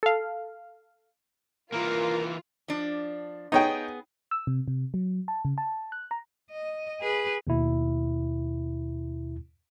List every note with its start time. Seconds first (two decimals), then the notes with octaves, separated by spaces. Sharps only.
0.03 A4 F5
1.72 E3 A#3 F4 A#4
2.68 F3 D4
3.52 B3 D#4 G#4 C#5 G5
4.31 E6
4.47 C3
4.68 C3
4.94 F#3
5.28 A5
5.45 C#3
5.58 A5
5.92 F#6
6.11 A#5
6.51 D#5
7.01 G#4 B4
7.47 D#2 B2 E4